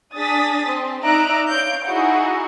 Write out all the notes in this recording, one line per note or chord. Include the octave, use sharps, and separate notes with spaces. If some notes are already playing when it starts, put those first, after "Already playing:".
D4 G#4 D#6 A6 B6
C4
D#4 D5 E5 A#5 F#6 D7
C#5 F5 G6 D7
D#4 E4 F#4 G#4 F#5